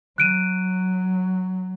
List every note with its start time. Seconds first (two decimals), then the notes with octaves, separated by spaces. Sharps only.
0.18 F#3 F#6 D7 D#7